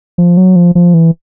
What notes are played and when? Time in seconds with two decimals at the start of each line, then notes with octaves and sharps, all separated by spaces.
0.18 F3
0.37 F#3
0.56 F3
0.75 F3
0.94 E3